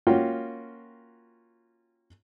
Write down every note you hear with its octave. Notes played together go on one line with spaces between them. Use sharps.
A#3 C#4 F4 F#4 G5